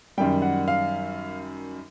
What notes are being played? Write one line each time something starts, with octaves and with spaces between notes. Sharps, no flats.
F#2 D#3 G3 G5
F#5
F5